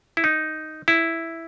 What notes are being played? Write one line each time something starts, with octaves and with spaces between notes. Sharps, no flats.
E4
D#4
E4